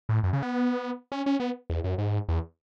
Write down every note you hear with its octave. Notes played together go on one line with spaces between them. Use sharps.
A2
F#2
C#3
B3
C#4
C#4
B3
E2
F#2
G#2
E2